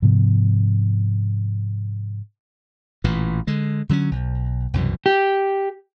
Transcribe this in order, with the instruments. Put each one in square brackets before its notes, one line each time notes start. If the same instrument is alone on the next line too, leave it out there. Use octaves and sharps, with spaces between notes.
[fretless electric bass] G#2 C3 F3 B3
[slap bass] A1 A#2 E3
D3 G#3
D3 F#3 A#3 C#4
B1
C2 F#2 B2 E3
[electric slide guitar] G4